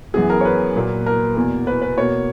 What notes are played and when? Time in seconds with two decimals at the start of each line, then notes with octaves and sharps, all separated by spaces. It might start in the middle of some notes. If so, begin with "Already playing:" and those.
0.14 F#2 E3 B3 G#4
0.30 A#4
0.41 C#5
0.45 B4
0.76 A#2 F#3 A#3
1.06 A#4
1.36 E2 B2 A#3
1.67 B4
1.82 B4
1.97 B2 A#3 C#5